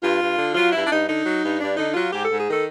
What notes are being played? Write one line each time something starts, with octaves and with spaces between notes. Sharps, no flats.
G2 F4
G2
D3
F#3 F4
G2 E4
D4
G2 D#4
D3 D#4
F#3
G2
G2 D4
D3 D#4
F#3 F4
G#2 G4
G#2 A4
G#4
D#3 A4